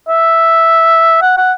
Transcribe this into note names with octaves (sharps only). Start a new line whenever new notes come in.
E5
F#5
F#5